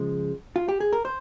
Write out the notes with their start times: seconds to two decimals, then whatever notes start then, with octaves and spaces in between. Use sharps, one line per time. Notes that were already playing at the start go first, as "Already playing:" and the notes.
Already playing: C#3 F3 G#3
0.56 F4
0.69 G4
0.80 G#4
0.93 A#4
1.05 C5